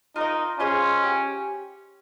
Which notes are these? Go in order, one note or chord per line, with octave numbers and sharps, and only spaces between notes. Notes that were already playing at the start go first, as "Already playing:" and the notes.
D#4 F4 A#4 D#5
C#4 F4 G#4 C5 D#5
G4